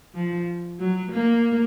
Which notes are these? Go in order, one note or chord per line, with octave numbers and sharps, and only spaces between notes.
F3
F#3
A#3